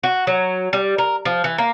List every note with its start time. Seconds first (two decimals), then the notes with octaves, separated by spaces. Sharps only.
0.03 F#4
0.27 F#3
0.73 G3
0.98 A#4
1.25 F3
1.44 E3
1.58 A#3